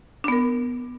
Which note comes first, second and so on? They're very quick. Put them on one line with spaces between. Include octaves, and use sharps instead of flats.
D4 B3 A#4